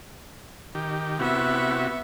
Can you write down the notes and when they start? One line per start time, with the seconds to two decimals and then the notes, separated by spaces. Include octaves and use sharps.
0.75 D#3 G4
1.19 C3 B3 E4 F#4 E5